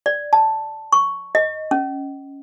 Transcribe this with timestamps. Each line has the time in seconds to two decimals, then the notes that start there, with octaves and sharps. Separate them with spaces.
0.06 D5
0.33 A5
0.92 C#6
1.35 D#5
1.71 C#4